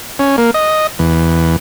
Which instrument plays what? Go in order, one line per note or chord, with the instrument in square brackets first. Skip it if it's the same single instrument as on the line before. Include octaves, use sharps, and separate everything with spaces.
[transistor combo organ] C#4
A#3
D#5
E2